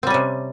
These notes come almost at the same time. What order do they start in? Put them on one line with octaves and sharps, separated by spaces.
C4 G3 C#4 C3